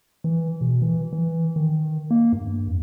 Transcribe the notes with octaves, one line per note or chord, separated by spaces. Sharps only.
E3
B2
E3
E3
D#3
A#3
G2
F2